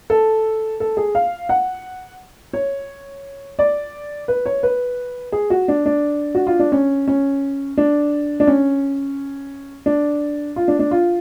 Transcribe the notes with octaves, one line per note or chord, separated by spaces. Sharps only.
A4
A4
G#4
F5
F#5
C#5
D5
B4
C#5
B4
G#4
F#4
D4
D4
F#4
F4
D4
C#4
C#4
D4
D4
C#4
D4
F4
D4
D4
F4